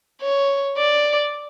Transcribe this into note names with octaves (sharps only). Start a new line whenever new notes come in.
C#5
D5